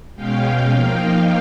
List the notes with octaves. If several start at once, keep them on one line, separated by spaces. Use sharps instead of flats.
B2 G#3 C#4 F5 G5
F3 A#3 D#4 F5 G5